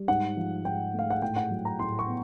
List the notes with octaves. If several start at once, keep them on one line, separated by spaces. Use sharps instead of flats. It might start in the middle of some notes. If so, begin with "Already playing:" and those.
Already playing: G3
G#2 F#5
F3
G#2 G5
A3 F5
F#5
A2 G5
F#5
F#3
A#5
A2 C6
C#6
B3